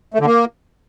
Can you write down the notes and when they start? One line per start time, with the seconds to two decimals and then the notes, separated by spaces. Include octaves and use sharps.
0.14 A3
0.20 D3
0.26 A#3